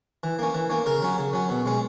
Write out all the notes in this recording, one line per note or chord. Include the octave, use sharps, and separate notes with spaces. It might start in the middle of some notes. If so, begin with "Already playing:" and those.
E3
A#3 C#4
E3
A#3 C#4
C#3 A#4
F#3 C#4
C#3
F#3 C#4
B2
G#3 C#4